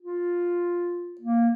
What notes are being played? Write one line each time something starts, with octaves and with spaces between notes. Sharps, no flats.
F4
A#3